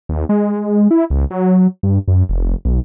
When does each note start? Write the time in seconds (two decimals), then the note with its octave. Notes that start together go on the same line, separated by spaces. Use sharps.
0.09 D#2
0.29 G#3
0.91 E4
1.10 C#2
1.31 F#3
1.83 G2
2.08 F#2
2.29 F1
2.65 B1